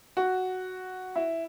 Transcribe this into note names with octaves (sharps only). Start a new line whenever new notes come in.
F#4
E4